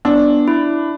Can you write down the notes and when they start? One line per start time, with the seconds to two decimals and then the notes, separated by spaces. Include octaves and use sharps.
0.05 B3 D4
0.48 E4